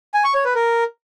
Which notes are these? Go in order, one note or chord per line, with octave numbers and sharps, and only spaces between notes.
G#5
C#6
C#5
B4
A#4